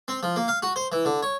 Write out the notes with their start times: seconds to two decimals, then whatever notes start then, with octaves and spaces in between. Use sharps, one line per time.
0.08 C4
0.23 F3
0.36 A#3
0.48 F5
0.62 F#4
0.76 C5
0.92 E3
1.05 D3
1.23 C#5